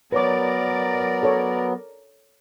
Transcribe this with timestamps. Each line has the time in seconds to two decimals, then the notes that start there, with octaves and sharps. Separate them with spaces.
0.12 F#3 B3 A#4 B4 C#5 D5 D6
1.23 A4 C#5